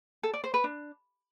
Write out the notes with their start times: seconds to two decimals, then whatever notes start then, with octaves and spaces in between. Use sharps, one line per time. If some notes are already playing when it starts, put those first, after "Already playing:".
0.23 A4
0.34 D5
0.44 C5
0.54 B4
0.64 D4